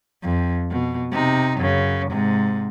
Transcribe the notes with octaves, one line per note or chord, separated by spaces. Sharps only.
F2
B2
C3 D#4
F#2 C#3
G#2 C3